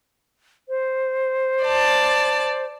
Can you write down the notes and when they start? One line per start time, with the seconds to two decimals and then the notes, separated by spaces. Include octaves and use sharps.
0.69 C5
1.65 D5 A5